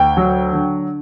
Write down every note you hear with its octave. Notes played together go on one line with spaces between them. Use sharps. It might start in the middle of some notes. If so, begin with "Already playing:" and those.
Already playing: D2 G5
F#3
D3